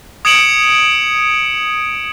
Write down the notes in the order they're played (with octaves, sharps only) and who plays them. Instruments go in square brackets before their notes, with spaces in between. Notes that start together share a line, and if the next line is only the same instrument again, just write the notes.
[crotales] D#6 G#6 C#7 D7 E7 F#7